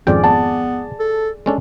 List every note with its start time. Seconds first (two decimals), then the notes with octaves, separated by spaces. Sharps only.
0.07 G#1 F2 C#4 G#4 D5 G5
0.24 B3 A5
0.99 A4
1.46 G#3 C#4 D4 A4